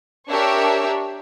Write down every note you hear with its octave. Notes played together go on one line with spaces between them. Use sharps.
D4 G4 A#4 C#5 E5